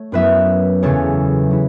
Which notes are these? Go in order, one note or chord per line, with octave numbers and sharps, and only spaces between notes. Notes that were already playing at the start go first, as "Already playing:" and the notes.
Already playing: A3 C#5
F#2 F#3 B3 E4 B4 E5
E2 C#3 F#3 A4 C#5
F#3 E4